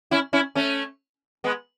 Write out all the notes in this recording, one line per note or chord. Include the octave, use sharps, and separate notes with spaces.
C#4 E4
C#4 E4
A3 C#4
G#3 B3